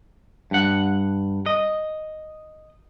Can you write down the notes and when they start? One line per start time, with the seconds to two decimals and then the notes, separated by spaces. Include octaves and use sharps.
0.51 G2 F#5
1.46 D#5